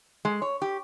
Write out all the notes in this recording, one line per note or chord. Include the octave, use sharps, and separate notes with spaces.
G#3
C#5
G4